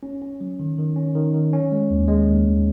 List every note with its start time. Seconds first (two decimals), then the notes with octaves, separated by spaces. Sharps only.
0.03 C#4
0.22 C#4
0.41 F#3
0.60 D#3
0.78 D#3
0.96 C#4
1.15 D#3
1.34 D#3
1.53 C#4
1.71 G#3
1.90 D#2
2.08 G#3
2.28 D#2
2.45 D#2